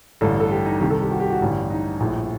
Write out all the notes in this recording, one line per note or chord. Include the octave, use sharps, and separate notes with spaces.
A1 G2 D3 A4
A4
G4
D#4
C2 C3 D#3 G4
A4
G4
F#4
G4
F#4
A1 G2 D3 G4
D#4
A#1 A2